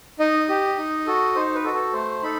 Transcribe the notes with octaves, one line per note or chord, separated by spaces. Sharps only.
D#4 D#5
G4
D#4
F#4 A4
D#4 C5
B4
F#4 A4
A4
A3 C5
D#4 A4 B5